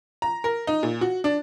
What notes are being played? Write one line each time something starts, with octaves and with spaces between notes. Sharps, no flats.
A#5
A#4
D#4
A#2
F#4
D4